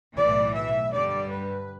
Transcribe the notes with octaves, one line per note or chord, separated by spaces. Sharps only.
B1 A2 E3 D5
E5
G2 D3 G3 D5
B4